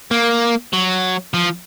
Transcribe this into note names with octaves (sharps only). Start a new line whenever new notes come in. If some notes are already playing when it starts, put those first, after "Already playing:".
A#3
F#3
F3